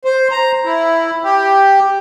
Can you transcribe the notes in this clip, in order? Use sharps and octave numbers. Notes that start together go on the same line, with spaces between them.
C5
A#5
E4
G4